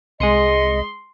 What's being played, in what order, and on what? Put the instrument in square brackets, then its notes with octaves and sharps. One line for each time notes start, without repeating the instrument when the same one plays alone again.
[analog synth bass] C2 [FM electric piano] G#3 D#6 C#7 [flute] D#5 [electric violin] C6